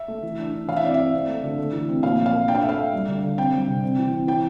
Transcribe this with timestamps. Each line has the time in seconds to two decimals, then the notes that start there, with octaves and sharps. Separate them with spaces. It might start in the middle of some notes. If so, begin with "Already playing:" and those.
Already playing: E5
0.08 A3
0.23 E3
0.39 D4
0.53 D4
0.68 E3 F5
0.76 E5
0.83 C4 D5
0.94 C4 E5
1.13 C4
1.28 A3
1.43 D3
1.58 A3
1.73 E3
1.89 C4
2.03 A#2 F5
2.18 F3
2.26 F5
2.33 A#3
2.48 D4 G5
2.55 F5
2.62 A3 E5
2.69 F5
2.79 A3
2.93 G3
3.08 D3
3.23 D3
3.37 C4 G5
3.53 G3
3.68 C3
3.83 C4
3.98 E3
4.13 C4
4.27 E3 G5